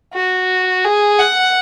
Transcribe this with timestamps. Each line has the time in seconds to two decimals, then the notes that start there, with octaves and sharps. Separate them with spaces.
0.14 F#4
0.84 G#4
1.19 F#5